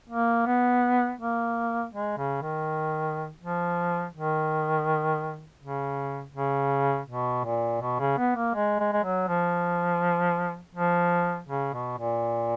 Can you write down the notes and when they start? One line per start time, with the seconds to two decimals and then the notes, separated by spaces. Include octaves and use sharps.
0.09 A#3
0.46 B3
1.19 A#3
1.93 G#3
2.17 C#3
2.42 D#3
3.41 F3
4.14 D#3
5.60 C#3
6.34 C#3
7.08 B2
7.44 A#2
7.81 B2
7.99 C#3
8.18 B3
8.36 A#3
8.55 G#3
8.79 G#3
8.93 G#3
9.03 F#3
9.28 F3
10.75 F3
11.48 C#3
11.73 B2
11.97 A#2